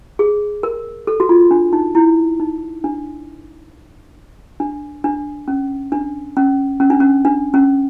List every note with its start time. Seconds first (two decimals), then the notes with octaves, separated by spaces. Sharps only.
0.19 G#4
0.63 A#4
1.07 A4
1.20 F#4
1.29 F4
1.51 D4
1.73 D#4
1.95 E4
2.40 D#4
2.84 D4
4.60 D4
5.04 D4
5.48 C#4
5.92 D4
6.37 C#4
6.80 C#4
6.90 D4
7.00 C#4
7.25 D4
7.54 C#4